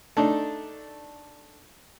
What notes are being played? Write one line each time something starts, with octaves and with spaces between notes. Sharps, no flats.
A3 D4 D#4